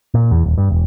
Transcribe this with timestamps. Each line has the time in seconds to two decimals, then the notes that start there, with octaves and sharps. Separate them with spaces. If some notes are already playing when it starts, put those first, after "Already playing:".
0.14 A#2
0.31 E2
0.44 D#1
0.58 G2
0.70 E1